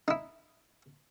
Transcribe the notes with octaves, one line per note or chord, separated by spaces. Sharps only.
D#4 E4